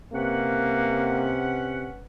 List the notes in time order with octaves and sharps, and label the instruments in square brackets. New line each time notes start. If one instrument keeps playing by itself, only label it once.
[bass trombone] C3 [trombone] A#3 [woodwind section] C#4 B4 F#5